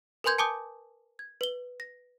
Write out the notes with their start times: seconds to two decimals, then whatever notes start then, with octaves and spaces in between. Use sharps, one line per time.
0.24 A#4 B4 G#5 C6 G6 G#6
0.38 G#5 A5 D6 D#6 G6
1.19 G#6
1.41 B4 G7
1.80 A#6